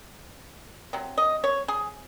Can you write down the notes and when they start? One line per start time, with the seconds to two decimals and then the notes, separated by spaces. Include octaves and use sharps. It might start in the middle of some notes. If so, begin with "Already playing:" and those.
0.93 C3 F#3
1.18 D#5
1.44 C#5
1.68 G#4